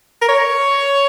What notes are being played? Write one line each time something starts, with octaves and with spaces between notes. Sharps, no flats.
A#4
C#5